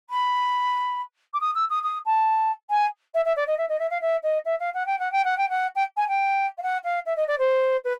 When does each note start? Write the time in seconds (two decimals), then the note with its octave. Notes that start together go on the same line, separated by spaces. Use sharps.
0.10 B5
1.33 D6
1.40 D#6
1.55 E6
1.69 D#6
1.83 D#6
2.06 A5
2.70 G#5
3.14 E5
3.25 E5
3.36 D5
3.47 D#5
3.57 E5
3.69 D#5
3.79 E5
3.90 F5
4.01 E5
4.23 D#5
4.45 E5
4.59 F5
4.74 F#5
4.86 G5
4.98 F#5
5.12 G5
5.24 F#5
5.37 G5
5.49 F#5
5.75 G5
5.97 G#5
6.08 G5
6.57 F5
6.62 F#5
6.84 F5
7.06 E5
7.16 D#5
7.27 D5
7.38 C5
7.84 B4